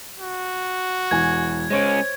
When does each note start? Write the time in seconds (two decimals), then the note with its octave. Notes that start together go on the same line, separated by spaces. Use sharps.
0.19 F#4
1.11 E1 E3 G#5 G#6
1.70 G#3 C#4 C5 C#5 D7